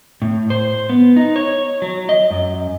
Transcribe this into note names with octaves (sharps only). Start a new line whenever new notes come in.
A2
C5
B3
D#4
C#5
F#3
D#5
F#2